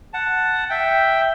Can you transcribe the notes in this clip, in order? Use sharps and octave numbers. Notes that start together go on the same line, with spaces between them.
F#5 A5
E5 G5